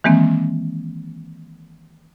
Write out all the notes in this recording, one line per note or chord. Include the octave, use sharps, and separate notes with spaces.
D#3 E3 G#3 A#3 C4